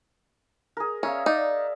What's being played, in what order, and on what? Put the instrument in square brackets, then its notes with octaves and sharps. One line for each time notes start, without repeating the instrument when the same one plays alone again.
[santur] G#4 A#4
[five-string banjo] C#4 [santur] A#4 E5 F5
[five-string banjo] D#4 [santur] D5